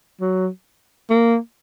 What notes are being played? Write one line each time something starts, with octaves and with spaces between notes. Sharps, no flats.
F#3
A#3